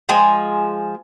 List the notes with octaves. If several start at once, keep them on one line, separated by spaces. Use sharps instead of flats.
F3 G#3 G#5